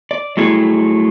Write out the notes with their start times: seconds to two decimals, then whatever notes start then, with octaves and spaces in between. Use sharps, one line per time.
0.11 D5
0.37 F#3 G3 A3 E4 G#4